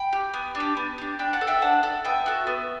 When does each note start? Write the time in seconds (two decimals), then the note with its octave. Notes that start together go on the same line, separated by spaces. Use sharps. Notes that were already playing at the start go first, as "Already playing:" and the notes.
Already playing: G5 B5
0.13 G4
0.34 B3
0.55 D4
0.60 G4
0.77 B3
0.98 D4 G4
1.19 D4 G5 B5
1.33 F#5 A5
1.41 A4
1.47 E5 G5
1.62 D4 F#5 A5
1.83 A4
2.05 B3 E5 G5
2.26 F#4 A4
2.47 B3